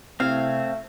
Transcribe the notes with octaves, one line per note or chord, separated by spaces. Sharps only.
C3 A3 C4 E4 F5 G#6